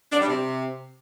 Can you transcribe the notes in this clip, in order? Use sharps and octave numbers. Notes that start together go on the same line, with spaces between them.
D4
G3
C3